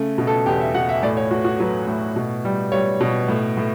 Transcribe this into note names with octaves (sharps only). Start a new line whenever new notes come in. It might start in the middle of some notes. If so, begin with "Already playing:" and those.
Already playing: C#3 A3
B2
A4
E2 G4
E5
B2 F#5
E5
A2 D5
C#5
A3 F#4
F#4
F#3 B4
A2
B2
G3
G3 C#5
B2
A2
A2